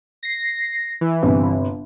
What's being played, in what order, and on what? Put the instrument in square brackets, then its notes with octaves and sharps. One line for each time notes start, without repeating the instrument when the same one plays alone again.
[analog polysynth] A#6 C7
E3
[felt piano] G1 C3